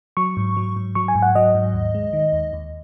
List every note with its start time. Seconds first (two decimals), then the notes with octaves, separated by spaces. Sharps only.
0.17 F#3 C#6
0.37 G#2
0.57 F#3
0.76 G#2
0.95 F#3 C#6
1.08 G#5
1.15 G#2
1.22 F#5
1.35 F#3 D#5
1.55 G#2
1.74 D#2
1.94 G#3
2.13 D#3
2.33 D#2
2.53 D#2